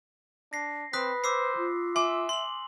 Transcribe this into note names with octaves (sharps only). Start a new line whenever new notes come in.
D4 A#6 C7
C4 B4 B5 D#6 F#6 B6
C5 D6 E6 C7
F4
E5 G#5 C6 D6
C6 F#7